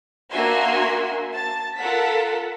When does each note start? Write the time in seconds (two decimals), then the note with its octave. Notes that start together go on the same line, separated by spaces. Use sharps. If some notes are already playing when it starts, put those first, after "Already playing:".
0.31 A#3 D4 F#4 E5 G#5 C6
1.34 A5 A6
1.78 F4 A4 A#4 F#5 B6